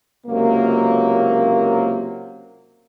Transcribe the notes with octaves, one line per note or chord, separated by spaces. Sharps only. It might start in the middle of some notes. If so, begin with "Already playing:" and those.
C#2 C3 F#3 A#3